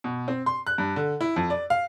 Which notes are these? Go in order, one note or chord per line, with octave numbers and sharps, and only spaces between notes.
B2
C4
C6
F#6
G2
D3
E4
F2
D5
F5